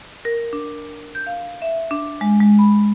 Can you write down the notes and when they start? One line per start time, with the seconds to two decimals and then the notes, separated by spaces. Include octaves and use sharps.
0.25 A#4
0.53 D4
1.15 G6
1.27 F5
1.62 E5
1.91 D4
2.21 G#3
2.40 G#3
2.59 B5